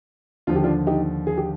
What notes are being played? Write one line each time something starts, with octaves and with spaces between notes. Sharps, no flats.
D#2 D3 F3 F4
G4
D4 F4
D#4 G4
G#4
G4